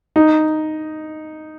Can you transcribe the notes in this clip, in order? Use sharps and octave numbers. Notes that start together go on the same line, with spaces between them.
D#4